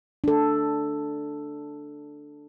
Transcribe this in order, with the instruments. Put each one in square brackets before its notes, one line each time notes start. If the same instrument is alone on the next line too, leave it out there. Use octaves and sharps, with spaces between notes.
[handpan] D4 A4